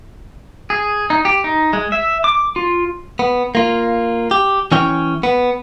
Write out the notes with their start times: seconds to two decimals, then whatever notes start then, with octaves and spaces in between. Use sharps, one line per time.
0.70 G#4
1.10 D#4
1.25 G4
1.44 D#4
1.73 G#3
1.92 E5
2.24 D6
2.56 F4
3.19 B3
3.55 A#3 F4
4.31 G4
4.72 E3 C#4 C#5 G5
5.23 B3